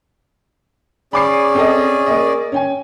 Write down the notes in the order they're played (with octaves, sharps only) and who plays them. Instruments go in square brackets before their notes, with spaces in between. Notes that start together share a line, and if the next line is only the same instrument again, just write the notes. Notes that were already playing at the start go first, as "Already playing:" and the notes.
[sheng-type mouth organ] C#4 G#4 D5 [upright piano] B5 D6 C7
[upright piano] C4 A4 D#5
A#3 D#5
C#4 G5 G#5